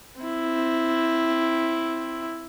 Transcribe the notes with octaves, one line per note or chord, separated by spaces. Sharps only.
C4 E4